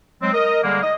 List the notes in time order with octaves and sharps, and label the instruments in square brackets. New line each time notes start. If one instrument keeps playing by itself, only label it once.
[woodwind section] F#3 G#3 C4
A#4 D#5
D3 G3 G#3 A#3
D#5